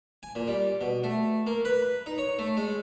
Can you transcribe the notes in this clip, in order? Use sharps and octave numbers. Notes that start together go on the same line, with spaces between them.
G#5
A#2
G3
B2
A3
A#3
B4
D#4
C#5
A3
G#3